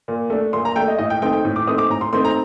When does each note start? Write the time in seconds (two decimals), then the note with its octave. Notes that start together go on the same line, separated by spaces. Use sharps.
0.08 A#2
0.30 A3 D4
0.53 A#2 C6
0.65 A#5
0.76 A3 D4 G5
0.88 D#5
0.99 A2 D#5
1.10 G5
1.22 A3 C4 D#4 G5
1.33 G5
1.45 A2
1.56 D6
1.67 A3 C4 D#4 D#6
1.78 D6
1.90 A2 A#5
2.01 C6
2.13 A3 C4 D#4 C6
2.25 A#5